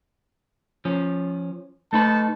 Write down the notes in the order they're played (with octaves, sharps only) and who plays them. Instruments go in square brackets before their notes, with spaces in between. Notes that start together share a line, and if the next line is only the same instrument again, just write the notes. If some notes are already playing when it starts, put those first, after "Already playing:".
[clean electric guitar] F3 C#4
[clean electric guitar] A3 D#4 B4 [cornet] A5